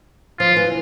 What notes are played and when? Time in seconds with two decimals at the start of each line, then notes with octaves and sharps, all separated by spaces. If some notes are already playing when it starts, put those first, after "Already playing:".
0.39 F3 F4
0.56 E3